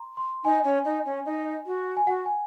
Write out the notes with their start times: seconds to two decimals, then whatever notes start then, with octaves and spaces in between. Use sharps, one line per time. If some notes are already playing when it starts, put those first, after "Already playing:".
Already playing: A#5 C6
0.17 C6
0.44 D#4 G#5
0.64 C#4
0.85 D#4
1.05 C#4
1.26 D#4
1.66 F#4
1.97 G#5
2.07 F#4 F#5
2.26 G#5